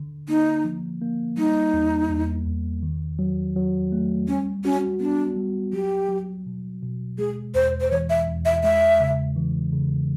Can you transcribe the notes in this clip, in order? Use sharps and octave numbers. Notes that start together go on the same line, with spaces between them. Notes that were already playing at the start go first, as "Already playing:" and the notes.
Already playing: D3
A#3 D#4
F3
A#3
G3 D#4
E2
E2
E2
D#3
F#3
F#3
A3
G3 C#4
C#4 F#4
B3 D4
G3
F#3 G4
F#3
B2
B2
G#3 G#4
E2 C5
C5
E3 C#5
E5
E2
E5
G#3 E5
C#3
E3
C#3